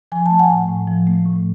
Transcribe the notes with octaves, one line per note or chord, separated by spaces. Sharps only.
F3 G#5
A3 A5
F#5 G#5
A2
A2
F3
A3
A2